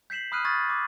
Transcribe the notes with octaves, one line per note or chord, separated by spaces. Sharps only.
G6 B6 C7 E7 F#7
B5 D#6 F6 F#6 C7 D#7
B5 C#6 D#6 F6 G#6 A6
D6